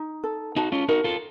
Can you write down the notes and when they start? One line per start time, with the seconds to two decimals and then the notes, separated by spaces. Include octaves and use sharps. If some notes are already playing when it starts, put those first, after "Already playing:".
Already playing: D#4
0.24 A4
0.56 D#4 F#4 A5
0.72 C#4 F4
0.88 D#4 F#4 A#4
1.04 F4 A4